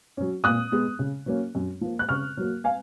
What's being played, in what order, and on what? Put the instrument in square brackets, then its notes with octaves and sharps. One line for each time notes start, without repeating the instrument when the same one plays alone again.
[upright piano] F#3 C#4
A#2 D#6 F#6
G#3 B3
C#3
F#3 A#3 C#4
F#2
F3 A#3
F#6
C#3 C#6 F6
F#3 A#3
F5 G#5